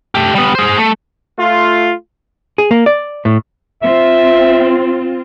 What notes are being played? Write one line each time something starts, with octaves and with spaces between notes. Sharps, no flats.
A3 G4
G3 B3
G#4 C5
A3
A3 F4
G#4
A#3
D5
A2
C4 F4 E5